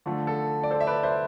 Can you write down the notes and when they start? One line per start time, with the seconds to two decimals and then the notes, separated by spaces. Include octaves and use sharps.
0.06 D3 F3 A3
0.27 A4
0.63 D5
0.71 A4 C5
0.80 E5
0.87 B4 D5
1.03 C5 E5